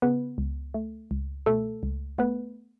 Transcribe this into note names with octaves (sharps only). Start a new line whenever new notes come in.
C#3 B3 B4
C#2
A3
C#2
B2 A3 A4
C#2
A3 B3 B4